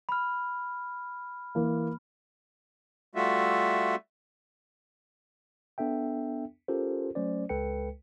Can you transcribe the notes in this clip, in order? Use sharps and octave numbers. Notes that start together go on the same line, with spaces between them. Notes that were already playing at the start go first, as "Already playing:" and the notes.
B5 F6
E3 A#3
G3 A3 F4 F#4 E5
B3 D4 A4 E5 G5
C#4 F4 G4 A4 A#4 C5
F#3 A3 C#4 C5 D5
C#2 G#3 A4 B4 G5 C#7